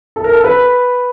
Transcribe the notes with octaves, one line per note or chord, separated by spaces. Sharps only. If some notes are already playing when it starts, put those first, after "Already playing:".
A4
A#4
A4
B4